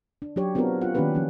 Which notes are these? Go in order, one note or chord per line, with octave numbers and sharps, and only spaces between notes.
D4
F#3 D4 G4 C#5
B3 C4 D4 F4 F#4 A#4
F4 F#5
D#3 A#3 C#4 D4 G4 B4
F3 C#4